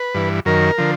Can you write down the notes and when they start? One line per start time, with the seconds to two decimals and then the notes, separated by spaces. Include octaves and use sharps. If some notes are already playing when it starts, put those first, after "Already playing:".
Already playing: B4
0.15 G2 E3
0.45 F#2 D#3 A#4
0.78 D3 F3